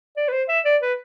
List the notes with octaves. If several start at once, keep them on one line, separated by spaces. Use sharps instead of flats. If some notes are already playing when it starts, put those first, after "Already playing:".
D5
B4
C5
E5
D5
B4